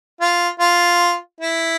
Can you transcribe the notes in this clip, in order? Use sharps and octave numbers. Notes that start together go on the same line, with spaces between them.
F4
F4
E4